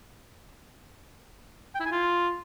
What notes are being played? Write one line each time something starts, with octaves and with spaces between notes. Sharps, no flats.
G5
E4
G#5
F4